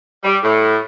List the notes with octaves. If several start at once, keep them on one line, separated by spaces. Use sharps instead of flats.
G3
A2